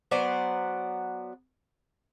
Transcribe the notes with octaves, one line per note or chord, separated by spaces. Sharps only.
F#3 B3 C5 D5